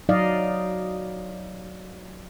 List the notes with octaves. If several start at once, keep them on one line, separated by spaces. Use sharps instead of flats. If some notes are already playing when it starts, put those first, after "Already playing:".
F#3 D#4 D5 D#5 F5